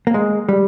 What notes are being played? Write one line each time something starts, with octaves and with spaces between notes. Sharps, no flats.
A#3
G#3
G3